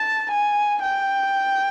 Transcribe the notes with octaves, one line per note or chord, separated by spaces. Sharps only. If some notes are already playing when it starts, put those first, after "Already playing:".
Already playing: A5
G#5
G5